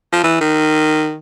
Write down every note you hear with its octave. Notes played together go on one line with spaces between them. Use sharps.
F3
E3
D#3